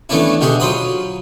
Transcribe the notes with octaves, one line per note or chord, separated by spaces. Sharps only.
E3 A3 B3 C#4 D4 E4
B2 D3 D4 G4 G#4
F#3 F4 C5 B5 D#6